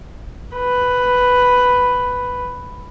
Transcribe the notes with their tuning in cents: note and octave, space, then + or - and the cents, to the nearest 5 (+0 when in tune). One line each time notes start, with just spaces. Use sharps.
B4 +5